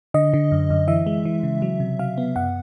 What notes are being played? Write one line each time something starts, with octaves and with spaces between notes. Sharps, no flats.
D3 D#5
D3
F#2
F#2
E3 E5
G#3
E3
C#3
F#3
C3
F#3 F5
B3
F#2 F#5